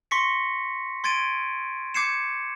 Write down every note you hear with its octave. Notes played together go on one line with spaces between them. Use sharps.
C6 C#6 A#6 B6 C#7
C6 G#6 A6 D7 D#7
D6 G6 G#6 C7 C#7 E7